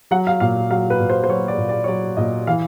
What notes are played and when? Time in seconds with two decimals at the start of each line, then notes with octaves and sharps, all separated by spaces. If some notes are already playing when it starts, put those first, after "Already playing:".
0.11 F#3 F#5
0.27 F5
0.40 A#2 F5
0.71 F#3 F5
0.90 B4
1.00 A#2
1.10 C5
1.24 C5
1.29 F#3 C#5
1.48 D5
1.58 A#2
1.69 D5
1.84 C#5
1.88 F#3 D5
2.17 A#2 D#5
2.47 E3 F5